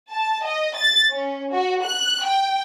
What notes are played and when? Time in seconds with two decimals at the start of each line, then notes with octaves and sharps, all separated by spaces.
0.10 A5
0.45 D#5
0.76 A6
1.12 C#4
1.52 F#4
1.84 F#6
2.25 G5